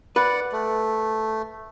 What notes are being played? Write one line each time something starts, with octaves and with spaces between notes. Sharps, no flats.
B4 D5 F#5
A3